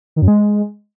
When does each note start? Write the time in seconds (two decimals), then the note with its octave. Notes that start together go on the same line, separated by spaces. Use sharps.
0.16 D#3
0.22 F#2
0.28 G#3